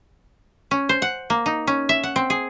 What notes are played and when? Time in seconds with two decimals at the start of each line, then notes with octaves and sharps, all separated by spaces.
0.71 C#4
0.89 C5
1.02 F#5
1.30 A#3
1.46 D#4
1.67 C#4
1.89 E5
2.03 F#5
2.16 C4
2.30 G#4